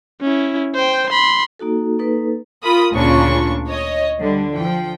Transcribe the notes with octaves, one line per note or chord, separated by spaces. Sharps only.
C#4 E4
C5 G5
B5 C6
A#3 D#4 F#4 A4
A#3 D#4 A4 B4
F4 A#4 B5 D#6
D2 A#2 C#3 D4 F4 C#6
C#5 D#5
D3 G3
F3 G5